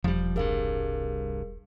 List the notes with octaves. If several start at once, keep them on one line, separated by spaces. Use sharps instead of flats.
E1 F3 G3
C2 G2 G#4 A#4 F5